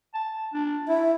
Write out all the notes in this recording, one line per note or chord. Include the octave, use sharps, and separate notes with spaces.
A5
D4
E4 E5